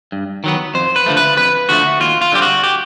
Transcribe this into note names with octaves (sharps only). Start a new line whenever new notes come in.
G2
D#3 F#3 B3
F2 C5
B4
D3 F3 A3
B4
F2 B4
D3 F3 A3 F#4
D#2 F4
F4
D3 G3 C4 G4
F#4
G4